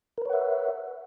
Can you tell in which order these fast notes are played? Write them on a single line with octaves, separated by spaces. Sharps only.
A#4 B4 C#5 F#5 E5